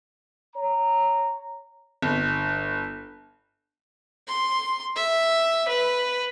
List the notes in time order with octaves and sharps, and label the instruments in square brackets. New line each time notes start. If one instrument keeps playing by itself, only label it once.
[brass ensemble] C#5 A#5
[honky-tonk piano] G1
[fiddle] C6
E5
B4